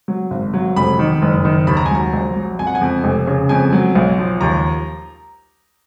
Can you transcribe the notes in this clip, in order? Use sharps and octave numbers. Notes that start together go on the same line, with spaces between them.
F#3
G#1
F#3
F1 B5
D#3
F#1
D#3
D#2 B5
A#5
G#5
F#3 A#5
A#1
F#3
F2 G#5
F#5
G#5
F2
F1
C#3
F2 G#5
F#3
B1
F3
D#2 A#5